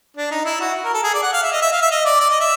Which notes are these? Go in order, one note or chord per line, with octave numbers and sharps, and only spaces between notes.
D4
D#4
E4
F#4
A#4
A4
G#4
D5
F#5
F5
E5
D#5
E5
F5
E5
D#5
D5
D5
D#5
E5